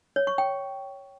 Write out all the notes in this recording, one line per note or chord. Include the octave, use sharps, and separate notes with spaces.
C#5
C#6
G5